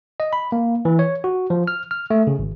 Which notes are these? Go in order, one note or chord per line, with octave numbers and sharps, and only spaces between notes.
D#5
B5
A#3
E3
C#5
F#4
F3
F6
F6
A3
C#3
G#1